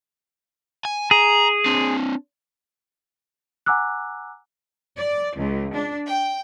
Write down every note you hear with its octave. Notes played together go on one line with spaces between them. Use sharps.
G#5
G#4 A#5
C4 D4
F#5 G#5 A#5 D6 E6 F#6
D5
C#2
D4
G5